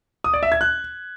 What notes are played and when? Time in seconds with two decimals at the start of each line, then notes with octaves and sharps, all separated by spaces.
0.24 D#6
0.34 D5
0.43 E5
0.52 G#6
0.61 F#6